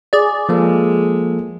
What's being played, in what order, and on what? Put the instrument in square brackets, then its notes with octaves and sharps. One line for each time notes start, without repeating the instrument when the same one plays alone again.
[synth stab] G#4 D5
[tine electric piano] F3 A#3 A4 [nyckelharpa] G#3